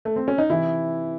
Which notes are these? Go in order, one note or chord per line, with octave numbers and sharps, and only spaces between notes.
A3
C4
C#4
D#4
C3 E3 E4